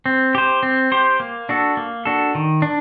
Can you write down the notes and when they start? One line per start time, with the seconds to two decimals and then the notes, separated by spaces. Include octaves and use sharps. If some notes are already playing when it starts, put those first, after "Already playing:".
0.06 C4
0.35 G4 C5
0.63 C4
0.92 G4 C5
1.20 A#3
1.49 D4 F#4 A4
1.77 A#3
2.05 D4 F#4 A4
2.35 D#3
2.62 D4